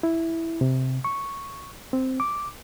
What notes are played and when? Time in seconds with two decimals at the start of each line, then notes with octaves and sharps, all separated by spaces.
0.03 E4
0.61 C3
1.05 C#6
1.93 C4
2.20 D6